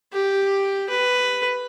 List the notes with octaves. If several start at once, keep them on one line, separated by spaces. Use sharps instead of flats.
G4
B4